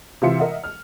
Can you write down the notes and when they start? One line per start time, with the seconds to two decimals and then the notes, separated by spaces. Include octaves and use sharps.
0.22 C3 E3 F4 E5 C6 C#7
0.39 A#4 D#5 E5 F#5
0.64 F6